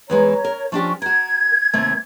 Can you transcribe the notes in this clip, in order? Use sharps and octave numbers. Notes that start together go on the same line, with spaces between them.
E2 E3 G#3 C#5 A#5
A#4
F3 C#4 D4 G4 C#6
F#4 A#4 G#6
D#2 C3 A3